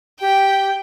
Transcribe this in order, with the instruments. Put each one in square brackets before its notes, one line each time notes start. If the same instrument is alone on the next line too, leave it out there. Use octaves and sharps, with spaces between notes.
[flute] G4 [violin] G5